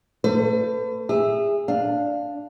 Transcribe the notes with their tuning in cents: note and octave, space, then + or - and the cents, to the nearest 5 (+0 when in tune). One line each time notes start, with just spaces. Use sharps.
A3 +35 B4 +40
G#4 -30 E5 +0
D4 +0 F5 +0